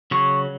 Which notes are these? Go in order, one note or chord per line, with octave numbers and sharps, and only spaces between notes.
C#3 F#3 C#6